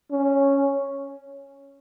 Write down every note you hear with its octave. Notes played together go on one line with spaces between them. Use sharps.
C#4